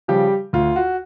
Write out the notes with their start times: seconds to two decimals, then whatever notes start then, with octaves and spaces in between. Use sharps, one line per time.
0.08 C#3 F3 G3 G4
0.53 D2 F4
0.76 F#4